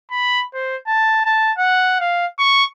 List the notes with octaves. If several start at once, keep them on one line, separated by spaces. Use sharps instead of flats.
B5
C5
A5
A5
F#5
F5
C#6